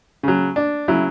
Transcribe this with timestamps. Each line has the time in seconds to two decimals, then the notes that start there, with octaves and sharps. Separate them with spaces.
0.23 C#3 F#3
0.56 D4
0.88 C#3 F#3 E4